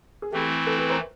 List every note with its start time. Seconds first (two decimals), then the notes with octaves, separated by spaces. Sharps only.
0.22 G#4
0.32 E3 A3 C4 E4 G4 A4
0.67 A4 B4
0.79 A4 B4
0.90 A#4 C5